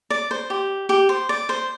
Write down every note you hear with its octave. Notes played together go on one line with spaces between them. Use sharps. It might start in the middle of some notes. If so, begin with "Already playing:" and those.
D5
C5
G4
G4
C5
D5
C5